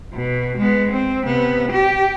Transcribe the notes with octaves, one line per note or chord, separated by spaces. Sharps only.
B2
G#3 B3
C4
C3 B3
G4